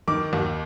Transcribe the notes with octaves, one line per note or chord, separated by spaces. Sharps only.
D#3 D6
D#2